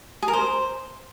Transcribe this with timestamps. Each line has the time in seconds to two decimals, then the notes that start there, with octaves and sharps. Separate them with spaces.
0.22 G#4
0.28 A#4
0.33 C5